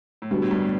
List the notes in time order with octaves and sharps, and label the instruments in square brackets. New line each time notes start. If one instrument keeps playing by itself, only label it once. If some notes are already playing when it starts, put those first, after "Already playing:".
[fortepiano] A2
[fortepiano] B2 [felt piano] D3 G3 B3 F#4
[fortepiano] A2
G2
A2